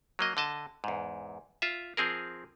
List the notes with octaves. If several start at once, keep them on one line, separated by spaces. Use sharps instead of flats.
F#3 A#3 D#5
D3 D#5 A5
E2 G#2
F4 E5
F3 C4 G#4 A#4